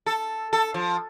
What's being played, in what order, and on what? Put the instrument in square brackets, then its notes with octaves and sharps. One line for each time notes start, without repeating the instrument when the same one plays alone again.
[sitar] A4
A4
F3